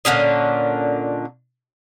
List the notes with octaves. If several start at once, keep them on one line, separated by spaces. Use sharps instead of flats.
A#2 D3 C#4 D#5